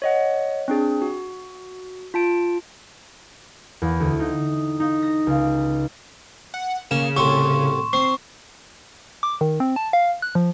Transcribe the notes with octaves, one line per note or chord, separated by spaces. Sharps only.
C#5 D#5 F#5
C4 D4 G#4
F#4
F4 A5 D7
E2
D2
D#4
D#4
A#6
C#2
F#5
C#3 A#3 E7
C2 A2 A4 C6 C#6
C4 C#6 C7
D6
D#3
C4
A5
F5
F#6
F3